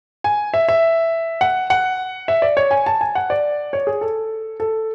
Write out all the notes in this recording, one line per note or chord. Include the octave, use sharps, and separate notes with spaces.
G#5
E5
E5
F#5
F#5
E5
D5
C#5
G#5
A5
G#5
F#5
D5
C#5
G#4
A4
A4